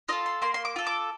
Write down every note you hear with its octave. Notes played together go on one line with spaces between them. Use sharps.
F4 A4 D#5
C6
A#3 C6
C6
D6
F4 A4
D6